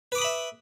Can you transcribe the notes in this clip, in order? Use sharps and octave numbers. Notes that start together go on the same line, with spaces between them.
B4 E5 B5 D6 D#6